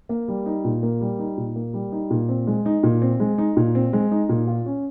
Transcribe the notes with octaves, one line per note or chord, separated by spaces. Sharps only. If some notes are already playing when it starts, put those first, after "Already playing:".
A#3
G3
D#4
A#2
A#3
G3
D#4
A#2
A#3
G3
D#4
A#2
C4
G#3
D#4
A#2
C4
G#3
D#4
A#2
C4
G#3
D#4
A#2
F4
C#4